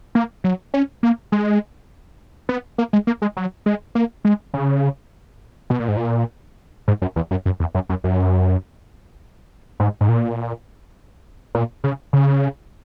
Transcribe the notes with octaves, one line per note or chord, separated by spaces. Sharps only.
A#3
F#3
C#4
A#3
G#3
B3
A#3
G#3
A#3
G#3
F#3
G#3
A#3
G#3
C#3
B2
A#2
G#2
A#2
G#2
F#2
E2
F#2
F#2
E2
F#2
F#2
F#2
G#2
G#2
A#2
A#2
C#3
C#3